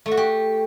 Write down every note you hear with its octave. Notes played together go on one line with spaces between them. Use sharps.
A3
F#4
G4